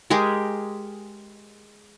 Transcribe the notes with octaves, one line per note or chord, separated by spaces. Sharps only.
G#3 G4 G#4 A#4